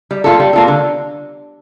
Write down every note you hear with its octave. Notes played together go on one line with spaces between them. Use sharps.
G3
A#3 F4 A4
G3
A#3 F4 A4
D3